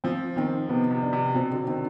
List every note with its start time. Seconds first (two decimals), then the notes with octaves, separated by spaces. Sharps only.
0.04 F3 C4
0.36 D#3 C4
0.69 C3 B3
0.91 C3
1.02 D4
1.13 C3
1.34 B2 C4
1.51 D3
1.67 D#3 C4